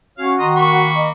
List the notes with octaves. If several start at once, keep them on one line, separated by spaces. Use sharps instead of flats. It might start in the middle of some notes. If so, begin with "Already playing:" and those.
C#4 F#4 C#5 F5
D#3 D#5 A#5 C6
A#3 B5 C#6
D#5